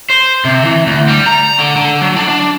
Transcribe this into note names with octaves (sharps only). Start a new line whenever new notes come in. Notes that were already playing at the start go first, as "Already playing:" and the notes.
C5
C3
E3
D2
G3
A#5
D3
D3
F#3
D4
D4